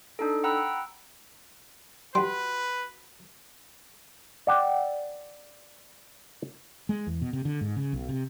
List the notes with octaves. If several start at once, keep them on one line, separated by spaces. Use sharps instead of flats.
D4 D#4 A4
F#5 G5 A#5 B5 E6 F#6
G3 F#4 B4 F#5 C6
D5 F#5 G5
G#3
E2
B2
C3
D3
G#2
C#3
B1
C3